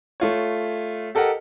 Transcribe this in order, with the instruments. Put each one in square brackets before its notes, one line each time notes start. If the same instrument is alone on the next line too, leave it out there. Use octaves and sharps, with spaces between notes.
[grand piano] A3 F4 C#5
G4 A4 A#4 D#5 F#5